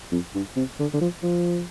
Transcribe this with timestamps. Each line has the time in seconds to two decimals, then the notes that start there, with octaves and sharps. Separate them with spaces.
0.12 F2
0.35 G2
0.56 C3
0.79 D3
0.94 D3
1.01 F3
1.23 F3